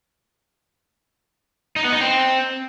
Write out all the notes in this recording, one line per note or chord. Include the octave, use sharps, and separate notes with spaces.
D#4
B3
D#4
C4